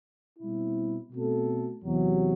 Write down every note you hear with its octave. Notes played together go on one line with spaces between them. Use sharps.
B2 G3 C4 E4
B2 A3 C4 F#4 A4
E2 C3 F#3